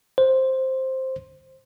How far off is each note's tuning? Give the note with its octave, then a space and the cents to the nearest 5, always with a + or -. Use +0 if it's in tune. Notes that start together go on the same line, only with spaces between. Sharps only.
C5 +5